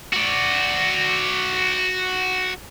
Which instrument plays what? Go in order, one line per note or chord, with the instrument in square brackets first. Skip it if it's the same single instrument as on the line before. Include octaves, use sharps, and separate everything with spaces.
[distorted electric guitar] F#4 D5